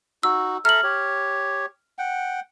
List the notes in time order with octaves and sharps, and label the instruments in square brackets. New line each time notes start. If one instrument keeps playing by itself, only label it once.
[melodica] D#4 F#4 [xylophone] E6
[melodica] A4 E5 A#5 [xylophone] F6 F#7
[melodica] G4 C#5
F#5 G5